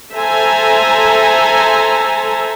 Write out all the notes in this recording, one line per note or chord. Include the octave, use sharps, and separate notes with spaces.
A4 C5 E5 G#5 A#5